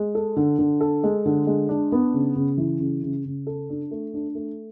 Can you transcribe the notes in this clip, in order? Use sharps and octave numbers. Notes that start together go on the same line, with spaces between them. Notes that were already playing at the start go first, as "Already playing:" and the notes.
Already playing: G#3
A4
D3
D3
A4
G#3
D3
G#3
D4
B3
C#3
C#3
E3
C#3
C#3
C#3
A4
D4
A3
D4
A3